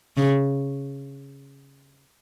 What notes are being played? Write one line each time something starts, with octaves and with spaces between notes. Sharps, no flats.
C#3